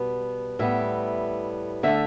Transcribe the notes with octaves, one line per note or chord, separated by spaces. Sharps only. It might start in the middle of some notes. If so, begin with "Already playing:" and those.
Already playing: B2 G3 B3
A2 G3 B3 E5
D3 A3 E5